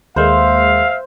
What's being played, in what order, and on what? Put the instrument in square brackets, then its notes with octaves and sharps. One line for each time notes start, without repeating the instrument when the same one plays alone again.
[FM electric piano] D#2 G#3 A#3 [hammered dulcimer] C5 [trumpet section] E5 F5